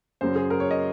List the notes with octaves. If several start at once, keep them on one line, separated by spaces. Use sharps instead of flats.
F#2 C#3 F#3 C5
G#4
A#4
C#5
D#5